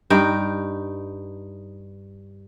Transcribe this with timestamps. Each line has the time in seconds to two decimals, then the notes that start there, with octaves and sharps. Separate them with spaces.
0.10 G2 D#4 G5